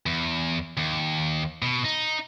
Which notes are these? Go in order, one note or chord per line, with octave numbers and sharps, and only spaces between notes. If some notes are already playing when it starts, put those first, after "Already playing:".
E2
D#2
B2
D#4